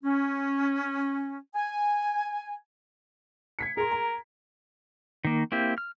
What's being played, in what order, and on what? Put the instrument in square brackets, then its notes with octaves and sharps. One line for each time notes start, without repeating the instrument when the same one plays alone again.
[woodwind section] C#4
G#5
[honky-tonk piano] G#6 B6 C#7
[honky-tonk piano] G#4 C6 [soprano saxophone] A#4
[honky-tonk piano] A#5
[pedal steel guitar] D#3 A#3
A#3 C4 E4 G4
F6